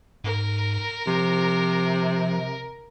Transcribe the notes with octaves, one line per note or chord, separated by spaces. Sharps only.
G#2 A#4
C3 F3